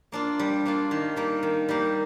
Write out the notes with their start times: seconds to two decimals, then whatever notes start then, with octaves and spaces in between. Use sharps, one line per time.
0.12 A#3 D4 F4
0.39 G3
0.65 A#3 D4 F4
0.91 D#3
1.16 G3 A#3
1.43 D#3
1.69 G3 A#3